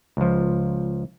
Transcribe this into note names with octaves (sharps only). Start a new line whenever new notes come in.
C#2 F3